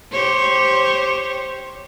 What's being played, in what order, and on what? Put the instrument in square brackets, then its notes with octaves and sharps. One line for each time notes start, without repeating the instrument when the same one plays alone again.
[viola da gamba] G4 C5 C#5